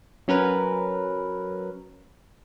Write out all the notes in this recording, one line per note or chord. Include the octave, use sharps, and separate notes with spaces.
F#3 C#4 A#4 B4